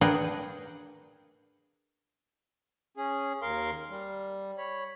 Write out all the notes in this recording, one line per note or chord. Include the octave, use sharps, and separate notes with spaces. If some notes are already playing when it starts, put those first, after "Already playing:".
D4 G#4 A#4 B4 F#5 G5
C#4 G#4
D#2 A#4 F5 C6
G3
C#5 B5